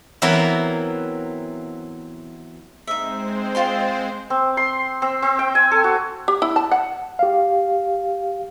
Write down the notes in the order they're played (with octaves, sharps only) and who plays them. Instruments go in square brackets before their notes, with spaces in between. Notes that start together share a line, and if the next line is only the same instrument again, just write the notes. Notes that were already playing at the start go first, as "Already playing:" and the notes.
[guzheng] E3 F#3 B3 C4 E4 A#4
[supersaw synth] G#3 C4 C5 [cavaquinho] D#4 E5
[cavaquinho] F4 G5 C6
[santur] C4
C6
C4
C4
G5
G#5
A4
F#4
[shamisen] G4
E4
A5
F#5
[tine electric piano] G4 F5